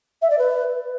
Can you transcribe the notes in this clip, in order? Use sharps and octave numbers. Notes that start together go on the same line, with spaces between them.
E5
D5
B4